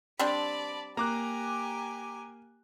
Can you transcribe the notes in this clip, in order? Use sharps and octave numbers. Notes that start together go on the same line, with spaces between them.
G3 C4 D4 D5 A5 B5
A#3 G4 G#5 A#5 D6 F#6